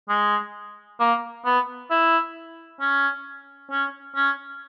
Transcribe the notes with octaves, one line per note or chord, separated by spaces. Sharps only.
G#3
A#3
B3
E4
C#4
C#4
C#4